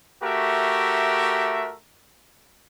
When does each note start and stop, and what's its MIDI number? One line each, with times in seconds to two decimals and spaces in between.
0.23 1.75 57
0.23 1.75 66
0.23 1.75 67
0.23 1.75 70
0.23 1.75 76